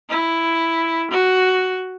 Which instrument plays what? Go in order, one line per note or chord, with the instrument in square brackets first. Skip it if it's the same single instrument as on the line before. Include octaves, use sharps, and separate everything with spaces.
[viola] E4
F#4